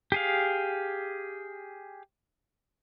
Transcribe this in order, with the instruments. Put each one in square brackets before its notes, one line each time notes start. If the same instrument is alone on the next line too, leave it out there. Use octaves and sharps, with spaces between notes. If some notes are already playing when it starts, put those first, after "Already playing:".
[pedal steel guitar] G4 G#4 F5